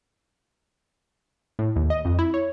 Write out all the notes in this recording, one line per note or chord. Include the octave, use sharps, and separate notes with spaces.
A2
D#2
D#5
F2
E4
C#5